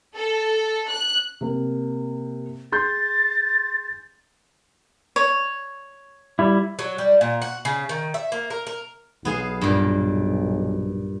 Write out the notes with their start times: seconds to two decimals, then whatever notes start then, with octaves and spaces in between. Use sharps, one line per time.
0.16 A4
0.91 F#6
1.41 C3 A#3
2.72 G#4 C6 G6 A6
5.16 C#5
6.39 G3 E4
6.79 F#3
6.98 G3
7.21 A#2
7.42 F#4
7.65 C#3
7.89 D#3
8.14 E5
8.32 A#3
8.50 A#4
8.67 A#4
9.25 B1 B3 G#4 F5
9.61 G2 A#2